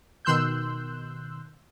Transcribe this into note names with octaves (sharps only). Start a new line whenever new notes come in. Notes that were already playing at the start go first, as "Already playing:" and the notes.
B2 D#3 C6 E6 F#6 G6